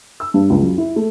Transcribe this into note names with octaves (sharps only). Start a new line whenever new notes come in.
E6
G2
C#2
F#2
E4
A3